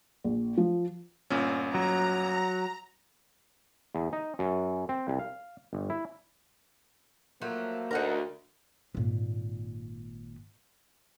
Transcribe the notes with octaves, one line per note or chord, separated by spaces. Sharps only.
A#1
F3
G1 A#2 C#4
F#3 A#5
E2
D#4
F#2
C4
C2
F5
G1
E4
F3 F#3 A3 A#3
D2 D#4 A#4 F#5 A#5
G#1 A#2